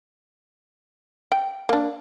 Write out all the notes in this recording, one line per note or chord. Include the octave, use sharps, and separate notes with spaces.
G5
A#3 D4